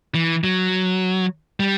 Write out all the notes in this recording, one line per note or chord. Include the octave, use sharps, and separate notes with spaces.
E3
F#3
G3